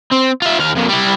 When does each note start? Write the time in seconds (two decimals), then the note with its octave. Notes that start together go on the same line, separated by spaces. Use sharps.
0.12 C4
0.42 F4 E5
0.59 D#2 F5
0.75 F2 A#2
0.88 G3 E4